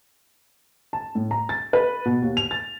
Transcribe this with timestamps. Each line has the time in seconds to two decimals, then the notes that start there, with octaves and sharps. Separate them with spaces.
0.93 A5
1.15 A2
1.31 A#5
1.49 A6
1.73 B4
2.05 B2
2.22 D#2
2.37 F7
2.51 A6